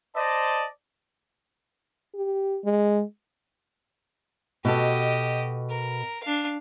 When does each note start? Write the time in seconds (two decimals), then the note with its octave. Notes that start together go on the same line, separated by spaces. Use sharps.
0.15 C5 D5 D#5 A5
2.15 G4
2.64 G#3
4.65 B2 F#4 G4 A4 D#5
5.70 A#4
6.23 D4 F5